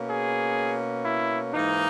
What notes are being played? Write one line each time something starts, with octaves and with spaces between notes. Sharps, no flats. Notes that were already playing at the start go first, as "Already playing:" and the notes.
Already playing: B2 A#3 C#4
G#4
E4
G#2 E3 A#3 D#4